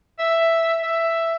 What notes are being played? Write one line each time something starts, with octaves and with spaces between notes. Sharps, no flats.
E5
E5